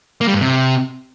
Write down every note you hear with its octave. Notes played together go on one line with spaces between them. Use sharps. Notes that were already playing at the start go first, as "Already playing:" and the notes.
A#3
G3
G2
C3